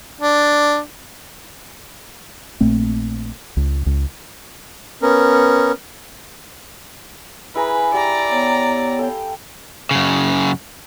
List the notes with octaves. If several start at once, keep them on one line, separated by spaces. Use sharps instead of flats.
D4
A#1 A#2 A3 C4
C#2
C#2
B3 C#4 A#4
E4 G#4 B4 A#5
G4 D5 A#5
B3 C#5
A4 F5 G5
F#2 C#3